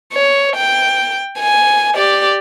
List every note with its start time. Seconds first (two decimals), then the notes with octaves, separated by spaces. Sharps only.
0.13 C#5
0.56 G5
1.40 G#5
1.95 G4 D5